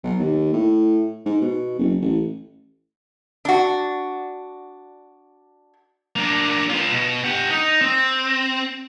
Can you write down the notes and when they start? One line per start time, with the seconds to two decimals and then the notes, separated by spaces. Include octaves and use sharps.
0.03 B1
0.19 D#2
0.53 A2
1.25 G#2
1.41 B2
1.79 F#1
2.01 A1
3.45 D4 F#4
6.16 A#3 D4
6.70 F4 B4
6.91 B2
7.24 G4 F#5
7.50 D#4
7.81 C4